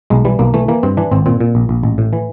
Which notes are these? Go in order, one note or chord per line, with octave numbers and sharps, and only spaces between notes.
B1 G#3
E3 G3
B1 A#3
E3 A3
E3 A#3
G2 C4
E3 D4
G#1 C4
A#2 C4
A#2
A#1
A#1
A1
A2
E3